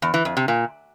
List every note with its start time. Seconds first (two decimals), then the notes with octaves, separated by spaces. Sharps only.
0.02 E2
0.14 E3
0.25 F2
0.37 C3
0.48 A#2